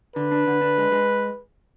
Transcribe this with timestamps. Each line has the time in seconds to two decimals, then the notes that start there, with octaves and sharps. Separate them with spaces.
0.16 D3 B4
0.31 D4
0.47 D3
0.61 D4
0.78 G#3
0.92 G#3